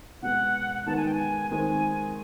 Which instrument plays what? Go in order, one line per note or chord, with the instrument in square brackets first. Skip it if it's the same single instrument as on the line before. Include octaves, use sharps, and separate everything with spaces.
[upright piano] B2 G#3 B3 [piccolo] F#5
[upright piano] D#3 G#3 B3 D#4 [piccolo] A5
[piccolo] G#5
G5
G#5
[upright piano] D#3 G#3 C4 [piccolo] G#5